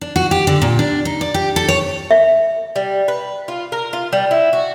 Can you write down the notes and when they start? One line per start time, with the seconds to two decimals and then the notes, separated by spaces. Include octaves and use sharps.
0.01 D4
0.16 F#4
0.31 G4
0.47 D3
0.62 A#2
0.79 D4
1.05 D#4
1.21 D5
1.34 G4
1.56 A4
1.68 C#5
2.11 E5
2.76 G3
3.08 B4
3.48 F4
3.72 A#4
3.93 F4
4.13 G3
4.31 E4
4.53 F#4